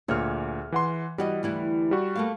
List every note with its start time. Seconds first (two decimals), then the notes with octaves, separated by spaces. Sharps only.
0.08 D2 A#2 G#4 C#5 E5 F6
0.72 E3 F#5 C6
1.18 E3 G3 F#4 D#5
1.43 D2 E3 E4
1.91 G3 F#4
2.15 A3 A#3 F5